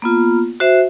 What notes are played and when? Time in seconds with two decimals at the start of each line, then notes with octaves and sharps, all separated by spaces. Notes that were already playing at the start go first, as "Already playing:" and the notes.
0.02 A#3 B3 F4
0.60 F#4 C5 E5